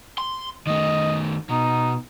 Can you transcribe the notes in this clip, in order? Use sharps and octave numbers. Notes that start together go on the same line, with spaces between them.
C6
D#3 A3 D#5
B2 D#4